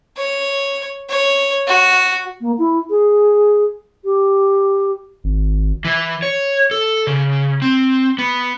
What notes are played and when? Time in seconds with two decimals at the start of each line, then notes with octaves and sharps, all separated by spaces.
0.17 C#5
1.09 C#5
1.67 F#4
2.41 A#3
2.58 E4
2.90 G#4
4.05 G4
5.24 G#1
5.85 E3
6.22 C#5
6.71 A4
7.07 C#3
7.62 C4
8.19 B3